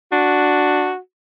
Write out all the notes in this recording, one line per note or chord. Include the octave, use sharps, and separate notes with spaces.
D4 F#4